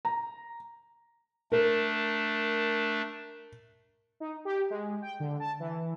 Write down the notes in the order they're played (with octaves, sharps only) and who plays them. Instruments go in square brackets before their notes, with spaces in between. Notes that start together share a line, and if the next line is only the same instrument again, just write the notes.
[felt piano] A#5
[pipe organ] A3 D4 [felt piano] A#4
[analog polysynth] D#4
G4
G#3
G5
D3
A5
E3